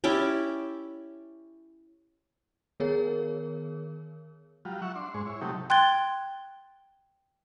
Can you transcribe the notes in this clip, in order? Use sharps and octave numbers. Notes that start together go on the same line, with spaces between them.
C#4 E4 G4 D5
D#3 B3 G#4 A#4 C#5
F#3 G3 F4
E5 F#5 C#6
D4 C6
G#2 G#3 C5 C#6
E4 C#5
C3 F#3 A3 D#4 G4
G5 C6 F#6 G#6 A6 G7